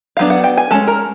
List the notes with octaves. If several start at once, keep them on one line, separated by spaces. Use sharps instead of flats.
F#3 B3 D4 F5
F#5
G5
G#5
G#3 C#4 A4 A5
A#4 A#5